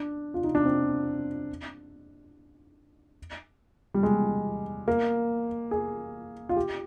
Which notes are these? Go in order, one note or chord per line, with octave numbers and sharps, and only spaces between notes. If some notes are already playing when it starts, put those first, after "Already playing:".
Already playing: D4
F4
D#4
D4
C4
G3
G#3
A#3
G#4
F4
G4